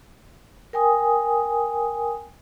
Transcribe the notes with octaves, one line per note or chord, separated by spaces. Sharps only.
A#4 G5 G#5 D#6